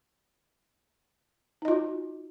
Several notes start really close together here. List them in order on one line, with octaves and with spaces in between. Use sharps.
D#4 D#5 F4 F#4